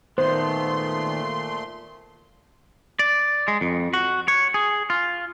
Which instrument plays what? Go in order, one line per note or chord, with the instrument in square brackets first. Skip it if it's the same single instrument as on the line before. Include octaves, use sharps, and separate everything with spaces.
[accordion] A#2 A3 C6 [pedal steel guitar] D#3 B3 [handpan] C5
[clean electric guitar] D5
G#3
F2
F#4
C#5
G#4
F4